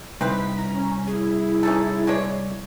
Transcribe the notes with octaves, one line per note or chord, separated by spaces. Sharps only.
C2 C4 D#4 B4 B6
C#4 A#5
E4 G#4
C#4 D#4 A4
G#3 D4 C#5